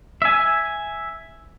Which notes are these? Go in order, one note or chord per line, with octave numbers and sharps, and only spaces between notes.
E5 G#5